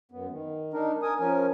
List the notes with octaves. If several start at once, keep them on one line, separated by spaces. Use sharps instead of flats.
F#2 B3
D#3
D4 D#4 A#4
A#4 G#5 D#6
F3 C#4 A#4 G#5